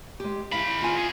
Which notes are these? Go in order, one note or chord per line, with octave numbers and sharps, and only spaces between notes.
G#3 G4
G#3 E4 F5 B5
F4 G#5
B3 G#4